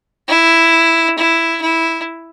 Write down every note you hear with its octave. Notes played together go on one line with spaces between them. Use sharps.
E4
E4
E4